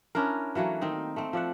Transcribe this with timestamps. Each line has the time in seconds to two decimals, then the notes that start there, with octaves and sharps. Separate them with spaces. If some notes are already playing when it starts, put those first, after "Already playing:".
0.15 C#4 D4 E4 A#4
0.55 E3 F#3 A3 A#3
0.81 D#3 C4 D#4
1.16 A3 C4
1.33 F3 D5 E5 F#5